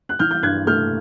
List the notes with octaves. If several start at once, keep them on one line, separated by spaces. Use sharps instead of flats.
F#6
E3 F6 G6
F6 G6
G2 F#6 G#6
A3 F6 G6